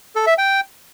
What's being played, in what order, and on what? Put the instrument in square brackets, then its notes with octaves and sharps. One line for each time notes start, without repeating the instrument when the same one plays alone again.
[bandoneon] A4
E5
G5